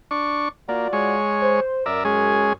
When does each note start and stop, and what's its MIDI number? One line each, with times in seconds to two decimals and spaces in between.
0.11 0.49 62
0.11 0.49 85
0.69 0.88 58
0.69 1.15 65
0.69 1.15 66
0.69 1.15 74
0.93 1.60 56
0.93 1.60 73
1.42 1.85 72
1.86 2.52 42
1.86 2.04 70
1.86 2.04 74
1.86 2.04 76
2.05 2.53 56
2.05 2.53 61
2.05 2.53 68